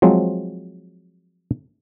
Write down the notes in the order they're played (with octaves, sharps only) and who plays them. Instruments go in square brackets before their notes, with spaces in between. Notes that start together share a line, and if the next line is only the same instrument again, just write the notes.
[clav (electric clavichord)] F3 F#3 G#3 C4